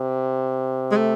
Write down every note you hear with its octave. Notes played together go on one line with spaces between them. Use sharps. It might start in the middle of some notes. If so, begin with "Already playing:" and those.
Already playing: C3
G#3
A3